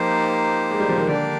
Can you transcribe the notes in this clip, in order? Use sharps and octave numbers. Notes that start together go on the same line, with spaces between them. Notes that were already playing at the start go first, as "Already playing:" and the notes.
Already playing: F3 A#3 D#4 G4 C5
G#3
G3
F3
D#3
D3 A#3 D4 G4 D5